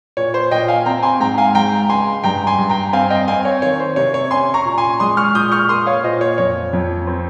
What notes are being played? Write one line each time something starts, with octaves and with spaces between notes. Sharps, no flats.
A#2 C#5
C5
A#2 D#5 G5
F5 G#5
C4 G5 A#5
G#5 C6
G#2 G5 A#5
F5 G#5
G#3 G5 A#5
C#2 G#5 C6
G2 G5 A#5
G#5 C6
G2
G5 A#5
C4 F5 G#5
D#5 G5
C4 F5 G#5
C#5
D#3 C#5
C5
C3 C#5
C#5
C#4 G#5 C6
A#5 C#6
A#2
G#5 C6
G#3 C6 D#6
C#6 F6
A#2 D#6 G6
C#6 F6
A#3 C6 D#6
C#5 F5
A#2 C5 D#5
C#5
F2 C#5
F2
C4